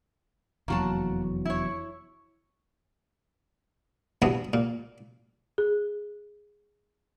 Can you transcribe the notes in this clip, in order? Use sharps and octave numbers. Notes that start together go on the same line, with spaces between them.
F1 E2 F#3 A#3 F#4 A5
E4 C#5
G2 E3 B3 F#4 A5 D#6
A#2
G#4